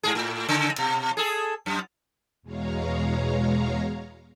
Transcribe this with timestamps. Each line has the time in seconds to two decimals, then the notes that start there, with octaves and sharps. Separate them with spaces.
0.03 G#2 C3 G#4
0.15 A2
0.49 C#3
0.78 B2
1.17 G#4 A4
1.66 F#2
2.42 E2 B2 G#3 C#5 F5 A#5